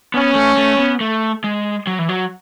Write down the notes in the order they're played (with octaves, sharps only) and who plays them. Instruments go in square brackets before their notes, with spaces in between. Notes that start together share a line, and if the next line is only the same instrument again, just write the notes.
[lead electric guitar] B3 [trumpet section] C#4
[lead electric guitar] A3
A3
B3
A3
G#3
F#3
E3
F#3